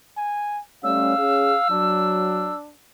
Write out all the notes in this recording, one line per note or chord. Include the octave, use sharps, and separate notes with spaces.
G#5
G3 A3 C#4 F5 E6
C#4 G#4
F#3 D4